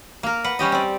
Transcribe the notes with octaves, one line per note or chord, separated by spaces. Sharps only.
A#3 A#4
B4 F#5
G3 C#4 G4 D#5
C4 D5